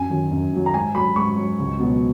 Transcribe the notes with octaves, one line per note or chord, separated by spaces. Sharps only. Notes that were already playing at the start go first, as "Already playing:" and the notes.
Already playing: F#2 G#5
D#3 F#3
F#2
D#3 F#3
A#5
G#2 G#5
F#3 B5
G#2 C#6
F#3
C#2
B2 F#3